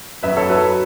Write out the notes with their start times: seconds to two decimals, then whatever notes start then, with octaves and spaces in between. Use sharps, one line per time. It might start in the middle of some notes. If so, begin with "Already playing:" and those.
0.23 F#2 B4 E5
0.37 A4 C#5
0.49 F#3 B4 E5